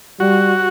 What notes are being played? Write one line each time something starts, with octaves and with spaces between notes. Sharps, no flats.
G3 F#4